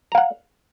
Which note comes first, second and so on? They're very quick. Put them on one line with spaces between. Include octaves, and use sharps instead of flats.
A#5 F5 F#5